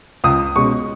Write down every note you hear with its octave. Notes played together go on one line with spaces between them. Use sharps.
C#2 D#6
B2 G#3 C#4 C#6